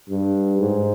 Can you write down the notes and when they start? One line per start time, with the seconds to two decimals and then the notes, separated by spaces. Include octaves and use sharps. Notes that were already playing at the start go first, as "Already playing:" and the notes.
0.09 G2
0.59 G#2